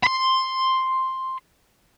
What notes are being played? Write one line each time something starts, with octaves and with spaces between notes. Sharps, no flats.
B5 C6